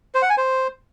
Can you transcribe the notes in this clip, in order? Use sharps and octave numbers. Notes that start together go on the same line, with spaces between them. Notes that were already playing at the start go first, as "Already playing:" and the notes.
C5
F#5
G#5
C5